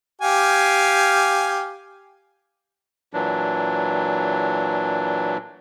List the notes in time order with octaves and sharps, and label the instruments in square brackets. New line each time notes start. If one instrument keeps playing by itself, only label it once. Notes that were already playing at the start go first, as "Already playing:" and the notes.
[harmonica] G4 F5 G#5
[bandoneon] A#2 E3 F#3 D4